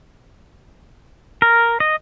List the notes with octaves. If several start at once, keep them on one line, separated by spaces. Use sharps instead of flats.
A#4
D#5